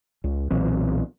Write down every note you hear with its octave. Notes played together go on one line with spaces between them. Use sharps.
C#2
B1 A#2 E3 C4